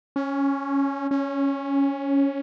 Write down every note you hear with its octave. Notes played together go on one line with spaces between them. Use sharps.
C#4
C#4